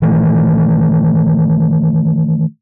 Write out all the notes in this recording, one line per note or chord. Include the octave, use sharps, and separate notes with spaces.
A#2 D#3 E3 A3